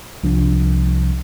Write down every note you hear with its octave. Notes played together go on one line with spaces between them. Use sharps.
C2 F3 D4